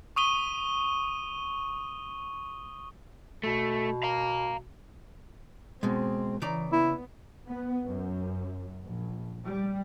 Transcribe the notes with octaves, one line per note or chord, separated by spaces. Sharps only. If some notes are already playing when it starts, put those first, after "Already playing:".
C#6 D#6 D#7 G7
B2 A3
F5 A#5
B2 G#3 C4
C#3 E3 D5 A#5
B3 E4
B3
F#2
A#1
G3